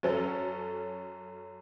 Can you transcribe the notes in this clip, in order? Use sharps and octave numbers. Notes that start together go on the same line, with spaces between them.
F#2 F#3 C#4 A4